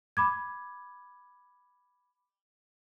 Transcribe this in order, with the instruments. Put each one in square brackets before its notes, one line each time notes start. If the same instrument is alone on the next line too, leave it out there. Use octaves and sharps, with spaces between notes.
[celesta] B5 D6 G#6